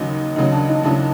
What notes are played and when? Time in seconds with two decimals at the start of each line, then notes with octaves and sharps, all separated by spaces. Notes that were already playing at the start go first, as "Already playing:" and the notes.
Already playing: D#2 C#3 F#3 D#4
0.36 D#2 C#3 F#3 D#4
0.52 D4
0.69 D#4
0.83 D#2 C#3 F#3 D4 E4